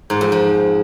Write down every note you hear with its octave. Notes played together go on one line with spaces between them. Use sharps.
G#2
F2
F3